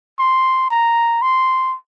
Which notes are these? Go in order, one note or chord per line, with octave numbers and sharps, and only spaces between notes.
C6
A#5
C6